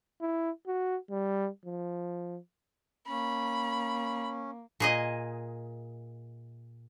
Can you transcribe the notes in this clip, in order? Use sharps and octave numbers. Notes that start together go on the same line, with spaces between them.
E4
F#4
G3
F3
A#3 C#4 B5
A#2 G#4 D#5